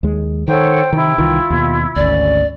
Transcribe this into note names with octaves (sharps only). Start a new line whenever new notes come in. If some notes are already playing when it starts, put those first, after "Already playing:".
D#2 G#3
D#3 A4 C5 C#5 F#5 G5
C3 D#3 E4
C2 D#3 E3 F4
D#2 B2
G#1 D2 C#4 D5